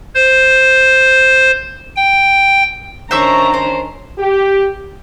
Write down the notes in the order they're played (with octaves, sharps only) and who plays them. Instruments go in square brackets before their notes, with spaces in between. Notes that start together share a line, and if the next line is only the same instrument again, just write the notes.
[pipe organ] C5
G5
[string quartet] D#3 C#4 D4 [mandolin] C5 E5 C#6 [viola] A#5
[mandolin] C5
[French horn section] G4